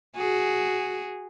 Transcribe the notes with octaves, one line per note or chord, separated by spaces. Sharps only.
F#4 G#4